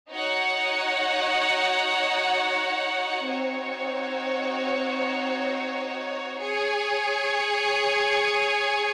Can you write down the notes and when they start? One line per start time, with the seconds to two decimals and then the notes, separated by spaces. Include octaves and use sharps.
0.10 D#4 F#4 C#5 F#5
3.25 C4 D#4 F#4 C#5
6.40 G#4 C#5 G#5